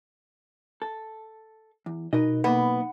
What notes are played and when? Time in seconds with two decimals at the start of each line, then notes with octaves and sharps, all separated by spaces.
0.82 A4
1.86 E2
2.13 B2 D#4 A#4 B4 D#5
2.44 B1 A#3 B3 D#5